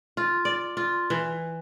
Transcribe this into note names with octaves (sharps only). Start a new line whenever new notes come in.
F4
D5
F4
E3